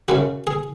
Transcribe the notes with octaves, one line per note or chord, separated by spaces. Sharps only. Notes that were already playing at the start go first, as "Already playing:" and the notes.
F#2 C#3 F#3 F#4
G#4